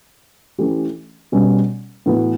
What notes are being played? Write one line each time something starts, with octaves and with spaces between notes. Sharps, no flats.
E3 A3 C#4 G4
B2 G3 C#4
A2 E3 B3 F#4